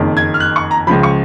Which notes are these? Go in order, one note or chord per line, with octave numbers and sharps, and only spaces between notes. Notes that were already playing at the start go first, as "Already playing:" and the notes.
Already playing: F#1 F2 D#3
G#6
F6
F#6
C#6
A#5
C#2 C#3 F3 B5
C#6